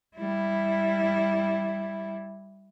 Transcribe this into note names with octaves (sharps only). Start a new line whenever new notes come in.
G3 E4